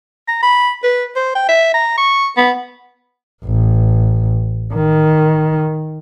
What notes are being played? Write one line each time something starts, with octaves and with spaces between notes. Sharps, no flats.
A#5
B5
B4
C5
G5
E5
A#5
C#6
B3
A1
D#3